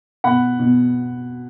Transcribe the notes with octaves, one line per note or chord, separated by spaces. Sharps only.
B2 F#5 B5
B2